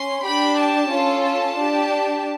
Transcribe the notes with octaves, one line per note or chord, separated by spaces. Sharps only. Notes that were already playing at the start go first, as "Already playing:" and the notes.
Already playing: C#4 C6
D4 G4 B5
A5
C#4 F4 A4
A5
D4 G4